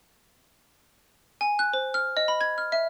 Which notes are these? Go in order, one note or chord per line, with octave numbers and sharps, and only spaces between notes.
G#5
F#6
C5
F6
D#5
B5
G#6
F6
E5